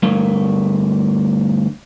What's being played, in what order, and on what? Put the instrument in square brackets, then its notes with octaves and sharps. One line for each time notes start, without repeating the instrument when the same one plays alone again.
[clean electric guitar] D2 G2 A3 A#3